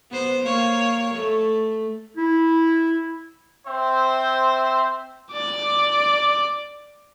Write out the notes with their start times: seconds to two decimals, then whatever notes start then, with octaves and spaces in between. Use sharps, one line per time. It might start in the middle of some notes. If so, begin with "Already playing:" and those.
0.10 B3 C5
0.42 A#3 C#5
1.15 A3
2.17 E4
3.66 C4 C5 E5
5.32 D5 D6